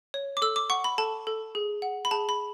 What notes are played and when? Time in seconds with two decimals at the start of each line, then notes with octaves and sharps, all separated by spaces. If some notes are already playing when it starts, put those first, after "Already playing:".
0.14 C#5
0.37 D6
0.42 A4 E6
0.56 D6
0.70 F#5 C#6
0.84 B5
0.98 A4 A5
1.27 A4
1.55 G#4
1.82 F#5
2.05 B5
2.11 G#4 A5
2.29 B5